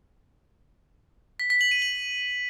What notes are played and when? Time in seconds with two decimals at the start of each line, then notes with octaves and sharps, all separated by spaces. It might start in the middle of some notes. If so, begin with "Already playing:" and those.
1.40 B6
1.50 B6
1.61 F#7
1.71 D#7
1.82 F#7